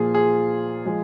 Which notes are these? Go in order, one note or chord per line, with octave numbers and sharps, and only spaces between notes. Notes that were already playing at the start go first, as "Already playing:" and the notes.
Already playing: A#2 F3 A#3 F4 G#4
G#4
F3 G#3